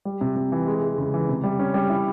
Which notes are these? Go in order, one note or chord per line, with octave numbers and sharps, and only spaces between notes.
G3
C3
C3
E3
G#3
G#3
C#3
E3
C3
G3
C#4
G3
E4